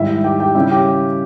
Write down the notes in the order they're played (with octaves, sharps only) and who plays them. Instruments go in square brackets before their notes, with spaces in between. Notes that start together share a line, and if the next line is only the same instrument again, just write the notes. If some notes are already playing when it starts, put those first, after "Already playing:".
Already playing: [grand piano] G#2 D#3 G3 E4 E5
G4 G5
G4 G5
C#3 G3 C#4 E4 E5
G4 G5